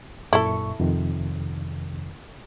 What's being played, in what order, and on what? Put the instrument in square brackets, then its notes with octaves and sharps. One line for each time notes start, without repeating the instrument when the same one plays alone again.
[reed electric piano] F#2 A#2 C#6 [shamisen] E4 A4
[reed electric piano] F2 C3 D#3